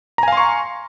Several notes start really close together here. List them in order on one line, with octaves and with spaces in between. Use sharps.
A#5 G#5 F5 C6 C#6